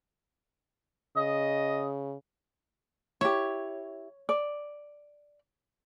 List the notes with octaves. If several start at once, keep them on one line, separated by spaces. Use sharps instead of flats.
C#3 D#5
E4 G4 C#5
D5